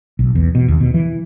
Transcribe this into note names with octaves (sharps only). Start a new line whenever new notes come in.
B1
E2
B2
D#2
B2
E3